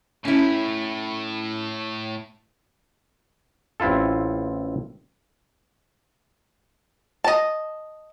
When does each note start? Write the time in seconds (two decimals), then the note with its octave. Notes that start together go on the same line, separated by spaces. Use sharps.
0.25 A2 A3 C#4 E4
3.80 A1 C4 E4 F4 A4
7.24 D#5 A5